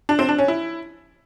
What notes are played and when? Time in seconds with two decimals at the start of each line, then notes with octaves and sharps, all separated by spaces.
0.09 D4
0.19 C4
0.29 D4
0.38 C#4
0.48 E4